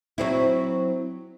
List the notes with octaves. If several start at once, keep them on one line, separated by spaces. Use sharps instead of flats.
F#3 C4 E4